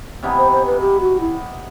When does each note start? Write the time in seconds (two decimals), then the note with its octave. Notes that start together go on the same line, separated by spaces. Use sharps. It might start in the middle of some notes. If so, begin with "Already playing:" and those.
0.23 C3 E3 B3 D#4
0.38 C5
0.52 C5
0.66 B4
0.81 G4
1.01 F#4
1.20 E4